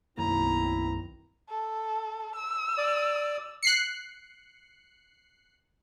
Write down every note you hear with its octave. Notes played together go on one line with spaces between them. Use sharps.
B1 F#2 D#3 A#3 C4 E4 A#5
A4
E6
D5
F#6 C7 C#7